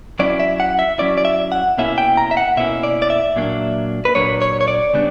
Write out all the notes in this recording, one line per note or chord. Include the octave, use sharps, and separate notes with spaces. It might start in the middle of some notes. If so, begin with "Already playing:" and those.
F#3 C#4 E4 D5
E5
F#5
E5
F#3 C#4 E4 D5
D5
E5
F#5
B2 A#3 C#4 E4 E5
G5
A#5
E5
F#5
B2 A#3 C#4 E4 E5
D5
D5
E5
A#2 F#3 A#3 D4
B4
A#2 F#3 A#3 D4 C#5
C#5
C#5
D5
C#3 G3 B3 D4